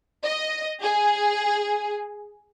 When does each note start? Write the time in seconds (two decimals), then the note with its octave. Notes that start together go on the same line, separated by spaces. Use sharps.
0.25 D#5
0.82 G#4